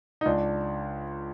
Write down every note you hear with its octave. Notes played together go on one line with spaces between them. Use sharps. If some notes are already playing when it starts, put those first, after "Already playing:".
D#4
C#2 D4